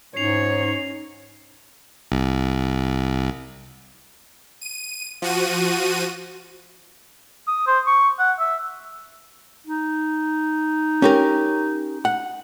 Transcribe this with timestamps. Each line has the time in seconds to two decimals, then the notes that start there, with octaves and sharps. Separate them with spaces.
0.16 G#2 C#4 D#4 C#5 C7 F7
2.12 C2
4.61 D#7
5.22 F3 F#4 D#7
7.48 D#6
7.67 C5
7.87 C#6
8.19 F#5
8.40 E5
9.67 D#4
11.02 C#4 G4 A#4
12.05 F#5